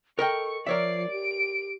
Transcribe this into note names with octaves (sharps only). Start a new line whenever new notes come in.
A4 A#4 D#5 G5 C#6
F3 A#4 C#5 D5 E5 C7
G4 D7